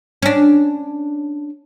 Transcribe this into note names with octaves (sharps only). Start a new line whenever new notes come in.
C#4 D4